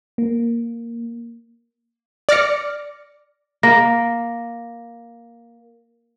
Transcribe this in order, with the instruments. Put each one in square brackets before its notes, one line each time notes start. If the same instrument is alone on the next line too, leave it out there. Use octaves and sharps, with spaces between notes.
[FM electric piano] A#3
[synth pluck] D5 D6 F6 A#6 C#7
[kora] A#3 [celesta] A#6